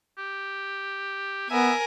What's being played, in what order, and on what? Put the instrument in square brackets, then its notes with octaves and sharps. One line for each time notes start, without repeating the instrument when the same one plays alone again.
[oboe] G4
[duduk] B3 [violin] A#4 G#5 [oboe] E5